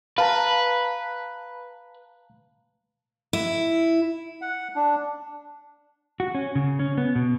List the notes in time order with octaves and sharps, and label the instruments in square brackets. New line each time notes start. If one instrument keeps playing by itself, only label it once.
[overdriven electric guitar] B4 [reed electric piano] F5 A5 A#5
[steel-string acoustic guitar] E4
[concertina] F#5
D4
[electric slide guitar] F#4
C#4
C#3
C#4
B3
B2